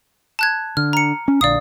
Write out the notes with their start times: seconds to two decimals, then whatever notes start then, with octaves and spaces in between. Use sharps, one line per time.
0.39 A5 F#6 G#6
0.77 D3 F6
0.93 A#5 C#7
1.28 C#4
1.41 A#1 D3 D5 F5 D#6